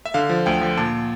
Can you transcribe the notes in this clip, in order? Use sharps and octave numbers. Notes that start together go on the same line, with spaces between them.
E5
D3 F5
F3
D2 G5
F3
A#2 A5